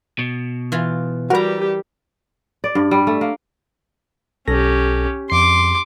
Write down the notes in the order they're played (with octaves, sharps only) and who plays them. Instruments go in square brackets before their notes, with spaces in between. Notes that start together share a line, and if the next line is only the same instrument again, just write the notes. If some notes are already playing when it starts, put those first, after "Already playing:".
[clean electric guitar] B2
[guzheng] E3 F4
[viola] G3 G4 [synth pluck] F#4 B4 [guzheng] A#4 A#5
[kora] D5
G2
G3
A3
A#3
[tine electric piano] B1 A4 A#6 [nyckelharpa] C#4 G4
[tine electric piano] F2 C7 [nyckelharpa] C6 D6